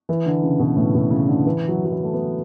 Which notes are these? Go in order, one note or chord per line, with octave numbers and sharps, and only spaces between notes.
E3
D3
C#3
B2
A2
B2
C#3
D3
E3
F#3
F#3
E3
A3
B3